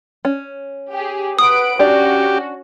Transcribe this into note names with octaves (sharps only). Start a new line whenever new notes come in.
C#4
G4 G#4
B4 F#5 D#6 D7
C#4 D4 F#4 G4 D5